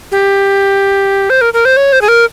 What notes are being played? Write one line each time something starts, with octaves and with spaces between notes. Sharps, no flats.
G4
C5
A#4
A#4
C5
C#5
C5
G#4
A#4